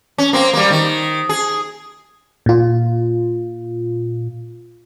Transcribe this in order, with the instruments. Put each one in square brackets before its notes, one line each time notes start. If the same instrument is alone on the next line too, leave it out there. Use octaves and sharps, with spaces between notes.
[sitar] C#4
A#3 C4
G3 A#3
D#3
G#4
[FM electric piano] A#2 F4